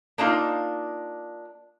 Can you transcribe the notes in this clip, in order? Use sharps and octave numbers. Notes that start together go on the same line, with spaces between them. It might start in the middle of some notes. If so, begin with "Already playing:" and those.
A#3 D4 D#4 F4